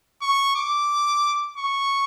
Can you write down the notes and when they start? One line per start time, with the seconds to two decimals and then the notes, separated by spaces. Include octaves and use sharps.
0.22 C#6
0.56 D6
1.57 C#6